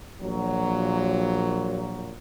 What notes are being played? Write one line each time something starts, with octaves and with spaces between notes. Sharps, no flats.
A#1 A#2 F#3